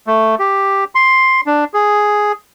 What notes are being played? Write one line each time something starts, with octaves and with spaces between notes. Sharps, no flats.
A3
G4
C6
D4
G#4